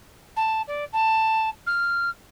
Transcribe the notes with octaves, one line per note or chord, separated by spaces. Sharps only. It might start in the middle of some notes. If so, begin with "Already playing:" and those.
A5
D5
A5
F6